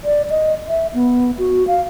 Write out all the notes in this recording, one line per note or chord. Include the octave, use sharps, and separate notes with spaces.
D5
D#5
E5
B3
F#4
F5